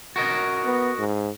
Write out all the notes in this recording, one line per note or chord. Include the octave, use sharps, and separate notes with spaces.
F#4 A#4 D#5
B3
G#2